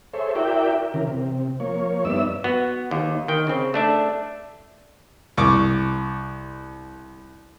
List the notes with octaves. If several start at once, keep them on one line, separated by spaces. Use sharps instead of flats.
G#4 A4 C5 C#5 E5
E4 F#4 A#4 D5 E5 G5
C#3 E3 A#4
C3
F3 A#3 C#5
G2 B3 D#4 D5 E5 E6
B3 F#4
D#2
D#3 G5
C#3 C4
A3 D4 E5
C2 C#6 D6